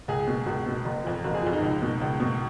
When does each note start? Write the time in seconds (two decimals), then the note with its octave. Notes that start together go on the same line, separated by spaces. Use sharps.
0.08 C#2 G#4
0.27 B2
0.46 C#2 F#4
0.66 B2
0.85 F#1
1.04 F2 F3
1.24 F#1 F#4
1.34 G#4
1.42 F2 F3
1.53 D#4
1.62 C#2
1.82 B2
2.01 C#2
2.20 B2